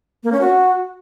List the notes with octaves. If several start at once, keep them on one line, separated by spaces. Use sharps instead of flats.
A#3
C#4
F#4